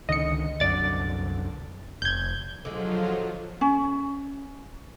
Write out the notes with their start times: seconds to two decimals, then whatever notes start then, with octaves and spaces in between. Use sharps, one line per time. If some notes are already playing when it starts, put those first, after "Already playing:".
0.09 C#2 D3 D#3 D#5 C#7
0.60 C2 F#2 D3 D5 A6
2.02 F1 G6 G#6
2.65 D3 F3 F#3 G#3 F4
3.61 C#4